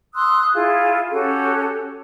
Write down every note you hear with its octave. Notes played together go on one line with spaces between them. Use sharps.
C6 D#6 E6 F#6
E4 F4 G#4
C#4 F#4 G4 A4